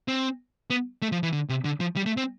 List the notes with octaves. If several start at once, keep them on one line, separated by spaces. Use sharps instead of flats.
C4
B3
A3
F3
E3
D3
C3
D3
F3
G3
A3
C4